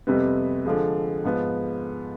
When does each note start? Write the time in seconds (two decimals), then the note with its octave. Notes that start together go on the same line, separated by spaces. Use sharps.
0.07 F2 C3 G3 B3
0.65 D3 F3 G#3
1.24 G#2 F3 B3